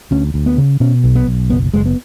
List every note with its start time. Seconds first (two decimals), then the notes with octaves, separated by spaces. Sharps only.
0.11 D2 C#4
0.34 D2
0.46 B3
0.58 C#3
0.80 B2 C#4
1.04 B1
1.15 B3
1.27 B1
1.50 F#1 B3
1.74 F#1 G#3
1.86 B3